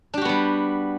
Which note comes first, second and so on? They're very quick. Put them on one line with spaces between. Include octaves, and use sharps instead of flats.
D4 G4 F#4 B3 G3